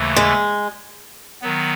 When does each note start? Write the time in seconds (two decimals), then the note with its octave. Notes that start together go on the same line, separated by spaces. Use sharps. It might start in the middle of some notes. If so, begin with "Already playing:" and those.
Already playing: D#2 C#3 E3 A3
0.16 G#3
1.42 D#3 F#3 B3